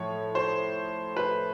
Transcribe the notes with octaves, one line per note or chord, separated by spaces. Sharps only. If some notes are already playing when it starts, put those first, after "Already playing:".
Already playing: A2 F3 C#5
C5
B4